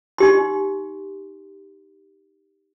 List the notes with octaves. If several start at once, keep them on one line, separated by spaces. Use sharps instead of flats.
D#4 G4 C6